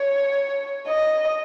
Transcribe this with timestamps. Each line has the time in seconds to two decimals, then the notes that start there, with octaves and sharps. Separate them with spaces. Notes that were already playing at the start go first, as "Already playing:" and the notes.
Already playing: C#5
0.88 D#5